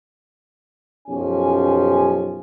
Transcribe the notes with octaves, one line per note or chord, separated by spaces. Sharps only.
B1 F#2 F3 C#4 G4 G#5